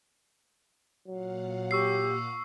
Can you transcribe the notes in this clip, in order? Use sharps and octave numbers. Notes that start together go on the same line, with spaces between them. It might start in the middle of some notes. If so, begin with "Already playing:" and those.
A#2 F#3 F5 F#5
G4 C#6 E6 C7